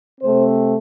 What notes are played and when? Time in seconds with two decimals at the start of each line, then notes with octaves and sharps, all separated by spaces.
0.21 C3 A3 C4 C5